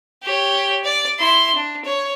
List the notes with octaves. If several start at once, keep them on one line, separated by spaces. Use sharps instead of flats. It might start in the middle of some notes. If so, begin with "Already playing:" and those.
G4 C#5
D5
E4 C6
D4
C#5